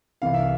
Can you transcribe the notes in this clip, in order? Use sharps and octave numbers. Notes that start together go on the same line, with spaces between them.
C2 C3 E3 F5
E5